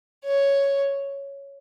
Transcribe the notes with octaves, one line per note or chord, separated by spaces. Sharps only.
C#5